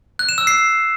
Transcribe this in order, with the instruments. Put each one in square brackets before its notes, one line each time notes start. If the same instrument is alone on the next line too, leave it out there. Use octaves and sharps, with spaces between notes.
[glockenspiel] F#6
E7
E6
C7